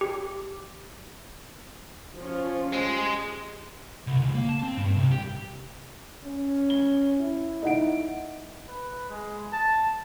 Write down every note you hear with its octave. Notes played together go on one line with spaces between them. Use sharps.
G4
F3 C#4 F4
G#3 G4
C2
C#2
A#3
A5
C4
G2
C2
G4
C#4
G7
E4
D#4 F#5 D7
B4
G#3
A5